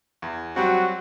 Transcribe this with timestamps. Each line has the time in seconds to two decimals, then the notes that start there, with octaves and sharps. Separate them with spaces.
0.22 E2
0.56 F#3 G3 C4 F#4